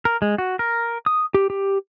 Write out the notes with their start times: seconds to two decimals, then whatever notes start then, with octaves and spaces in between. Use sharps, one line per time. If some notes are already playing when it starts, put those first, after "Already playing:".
0.05 A#4
0.22 G#3
0.38 F#4
0.59 A#4
1.06 D#6
1.34 G4
1.50 G4